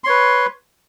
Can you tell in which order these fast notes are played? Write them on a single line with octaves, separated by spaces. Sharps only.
C6 C#5 B4